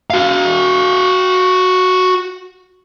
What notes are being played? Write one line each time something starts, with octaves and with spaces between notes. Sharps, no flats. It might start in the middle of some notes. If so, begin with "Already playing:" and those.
F#4 F5